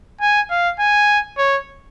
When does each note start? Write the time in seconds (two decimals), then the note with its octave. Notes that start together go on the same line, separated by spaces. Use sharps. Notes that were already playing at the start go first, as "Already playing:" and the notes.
0.21 G#5
0.51 F5
0.80 G#5
1.38 C#5